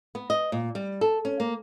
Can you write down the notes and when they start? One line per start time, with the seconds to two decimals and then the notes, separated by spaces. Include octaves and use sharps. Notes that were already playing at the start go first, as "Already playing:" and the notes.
0.15 B3
0.30 D#5
0.52 A#2
0.75 G3
1.01 A4
1.25 C#4
1.40 A#3